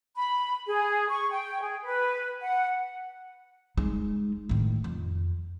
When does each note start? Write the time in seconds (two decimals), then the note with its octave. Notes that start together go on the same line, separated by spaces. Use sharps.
0.16 B5
0.67 G#4
1.09 C#6
1.31 G5
1.61 G#4
1.84 B4
2.42 F#5
3.77 G#3 D#4
4.49 A2 D#3
4.84 F2